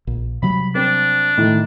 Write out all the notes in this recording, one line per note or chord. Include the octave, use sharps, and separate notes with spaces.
A#1
C3 F#3 G3 B5
C4 D4
A2 D#3